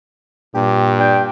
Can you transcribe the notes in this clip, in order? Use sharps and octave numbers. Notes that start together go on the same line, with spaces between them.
G2 A#2 G4
D4 G5